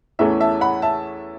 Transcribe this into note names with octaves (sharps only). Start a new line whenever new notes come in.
E2 E3 A3 C#4 E5
E5 A5
F#5 B5
E5 A5